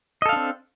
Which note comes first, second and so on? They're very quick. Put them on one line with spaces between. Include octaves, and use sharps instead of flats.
D#5 A4 F5 D4 C4